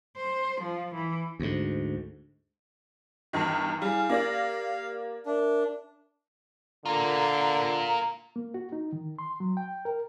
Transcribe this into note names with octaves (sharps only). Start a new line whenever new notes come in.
C5
F3
E3
D2 G#2
E2 G2 D#3
G3 E4 G#4 F5 G#5
A#3 G4 D5 A#6
D4 A#4 E5
D3 A#3 F4 A#5
A#3
F#4
D#4
D#3
C6
F#3
G5
A#4